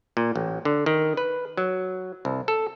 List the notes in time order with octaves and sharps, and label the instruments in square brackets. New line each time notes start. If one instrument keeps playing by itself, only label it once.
[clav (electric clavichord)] A#2
A1
D3
D#3
B4
F#3
C2
A4